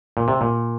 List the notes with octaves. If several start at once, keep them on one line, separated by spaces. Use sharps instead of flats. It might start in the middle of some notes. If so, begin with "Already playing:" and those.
A#2
C3
A#2